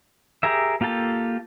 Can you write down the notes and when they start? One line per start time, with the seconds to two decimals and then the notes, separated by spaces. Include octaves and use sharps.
0.43 G4 G#4 A#4 E5
0.81 A#3 F4 G4 A4 A5